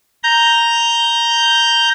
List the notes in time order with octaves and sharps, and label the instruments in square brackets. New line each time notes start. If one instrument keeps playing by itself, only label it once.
[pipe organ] A#5 G6